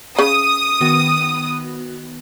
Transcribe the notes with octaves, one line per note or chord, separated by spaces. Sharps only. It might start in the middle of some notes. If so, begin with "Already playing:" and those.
C#3 D#6
D#3 B3 F#4